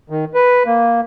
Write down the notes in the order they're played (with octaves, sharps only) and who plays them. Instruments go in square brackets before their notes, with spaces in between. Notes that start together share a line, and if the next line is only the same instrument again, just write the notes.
[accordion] D#3
B4
A#3